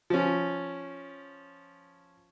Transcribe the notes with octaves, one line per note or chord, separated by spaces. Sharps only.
F3 C#4